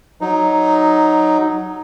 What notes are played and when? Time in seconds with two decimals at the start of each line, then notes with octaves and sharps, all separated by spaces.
0.21 F#3 D#4